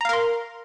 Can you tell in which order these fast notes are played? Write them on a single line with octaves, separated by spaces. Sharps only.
A#5 F5 A#4 C6